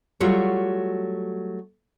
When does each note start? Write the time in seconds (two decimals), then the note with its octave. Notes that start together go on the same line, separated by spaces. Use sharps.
0.20 F#3 G3 A3 F4 F#4 C#5